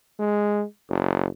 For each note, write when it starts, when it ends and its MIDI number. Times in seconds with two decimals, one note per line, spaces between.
0.19 0.64 56
0.89 1.27 30